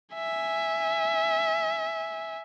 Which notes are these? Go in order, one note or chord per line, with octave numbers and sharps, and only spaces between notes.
E5 G#5